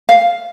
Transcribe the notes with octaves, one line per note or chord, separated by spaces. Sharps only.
F5